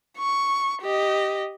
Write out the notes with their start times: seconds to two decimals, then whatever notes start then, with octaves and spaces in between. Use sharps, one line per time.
0.18 C#6
0.82 G4 D#5